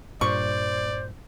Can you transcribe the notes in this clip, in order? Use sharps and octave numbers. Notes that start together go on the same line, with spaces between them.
G2 A#2 C5 D5 C#6